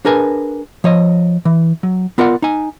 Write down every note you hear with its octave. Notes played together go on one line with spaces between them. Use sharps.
D4 G#4 A#4 B4 G#5
F3 C#5 D#5
E3
F#3
B3 F4 A#4 D5 F#5
D#4 G#5